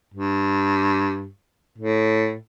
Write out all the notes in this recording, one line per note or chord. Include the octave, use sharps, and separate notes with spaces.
G2
A2